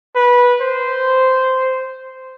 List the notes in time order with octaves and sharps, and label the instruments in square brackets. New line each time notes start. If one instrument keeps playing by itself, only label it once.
[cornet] B4
C5